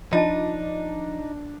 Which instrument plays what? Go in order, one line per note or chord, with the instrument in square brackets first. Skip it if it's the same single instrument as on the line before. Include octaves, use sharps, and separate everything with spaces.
[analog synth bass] F3 [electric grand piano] D4 [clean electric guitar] D#4 [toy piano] F4 D#5 A5